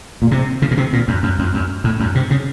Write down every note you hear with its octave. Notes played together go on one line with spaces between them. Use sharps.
A#2
C3
C#3
A#2
C3
A#2
F#2
F#2
F2
F#2
A2
F#2
C3
C#3